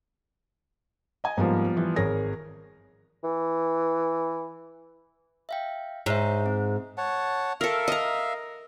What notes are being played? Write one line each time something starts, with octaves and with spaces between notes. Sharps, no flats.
D#5 G#5
G#2 F3 G3 A#3 B3
E3
G#1 G#4 A#4 C#5 A#6
E3
E5 F5 G5
G#2 C#5 E5
C4
C#5 F#5 A5
A4 A#4 E5 F5
D#5 A#5